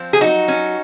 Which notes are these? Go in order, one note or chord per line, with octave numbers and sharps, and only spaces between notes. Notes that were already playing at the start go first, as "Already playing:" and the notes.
Already playing: F3 C4
G#4
F#3 D#4 F#4
C#4